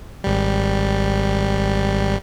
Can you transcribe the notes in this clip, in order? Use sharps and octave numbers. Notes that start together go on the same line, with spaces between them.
G#1 G3